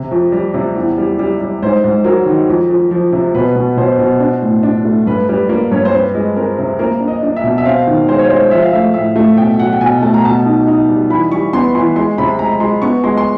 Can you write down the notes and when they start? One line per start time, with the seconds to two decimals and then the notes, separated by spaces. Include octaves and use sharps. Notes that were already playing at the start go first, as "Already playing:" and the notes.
Already playing: C3
0.11 F2
0.32 G3
0.54 C3
0.76 E2
0.98 G3
1.19 G3
1.40 G3
1.62 G#2 C5
1.84 G#2
2.04 F#3 A#4
2.26 D#3
2.49 F2
2.70 F2
2.91 F3
3.12 C3
3.35 B2 B4
3.56 B2
3.77 B2 C5
3.99 B2
4.20 D4
4.42 A2
4.63 D4
4.85 A3
5.06 G2 B4
5.28 G3 B4
5.49 A#3
5.71 G2 C#5
5.85 C5
5.93 C4 B4
6.14 G#3
6.36 C4 A#4
6.58 C3
6.79 A#3 A#4
7.00 D4
7.08 D#5
7.23 D4
7.36 E5
7.44 B2
7.58 E5
7.66 C4 F5
7.87 D#3
8.08 G#3 C5
8.19 C#5
8.30 G#3 C5
8.51 F3 E5
8.62 F5
8.73 A3 E5
8.94 A2 E5
9.16 A3
9.37 B2 G5
9.59 F#3 F#5
9.73 G5
9.81 B2 G#5
10.02 A3 A5
10.14 A#5
10.24 B2 A5
10.45 D#4
10.67 D#4
10.89 G3
11.10 E3 B5
11.31 G3 C#6
11.53 B3 C6
11.75 E3 C6
11.96 G#3 C6
12.18 C3 B5
12.39 G#3 A#5
12.60 G#3 C6
12.82 B3 C#6
13.04 G#3 C6
13.17 C6